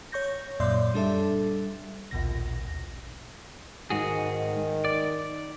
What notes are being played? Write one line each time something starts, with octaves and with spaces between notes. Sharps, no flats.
C#5 C#6 G6 A#6
F#2 A#2 D5 E5 C6 G6
G3 D4 A4 E5
A#1 D#2 B2 A#6
G#2 D#3 F#4 G#4
D5